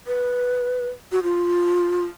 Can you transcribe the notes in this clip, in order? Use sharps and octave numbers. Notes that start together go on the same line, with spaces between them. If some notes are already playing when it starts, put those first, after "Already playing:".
B4
F#4
F4